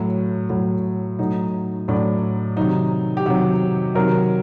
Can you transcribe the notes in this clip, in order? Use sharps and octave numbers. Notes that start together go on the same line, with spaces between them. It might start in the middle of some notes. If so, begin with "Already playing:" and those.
Already playing: A2 F#3
A2 F#3
A2 F#3 D#4
A2 F#3 D4
C3 D#3 F#3 D#4
G4
C3 D#3 F#3 F#4
C3 D#3 F#3 A#4